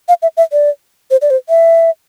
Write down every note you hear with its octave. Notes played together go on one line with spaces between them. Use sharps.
F5
E5
E5
D5
C5
D5
C5
E5